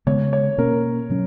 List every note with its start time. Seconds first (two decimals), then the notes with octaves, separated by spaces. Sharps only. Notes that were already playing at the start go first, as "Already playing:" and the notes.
0.07 C#3 G#3 B3 C#5
0.33 C#5
0.58 B2 A#3 C#4 A#4
1.10 B2 F#3 C#4